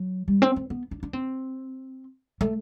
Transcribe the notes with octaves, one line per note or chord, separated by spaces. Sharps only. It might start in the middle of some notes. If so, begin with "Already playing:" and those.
Already playing: F#3
G3
C4
C4
B3
D4
D4
C4
A3